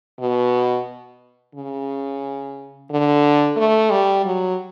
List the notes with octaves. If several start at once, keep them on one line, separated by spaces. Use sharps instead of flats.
B2
C#3
D3
A3
G3
F#3